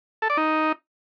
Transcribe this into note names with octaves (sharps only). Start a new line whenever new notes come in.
A4
D5
D#4